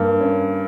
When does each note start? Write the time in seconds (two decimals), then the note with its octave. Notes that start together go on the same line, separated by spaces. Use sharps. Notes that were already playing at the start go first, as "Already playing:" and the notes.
Already playing: G2 A#3
0.21 C#4